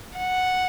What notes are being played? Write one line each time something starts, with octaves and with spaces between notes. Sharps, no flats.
F#5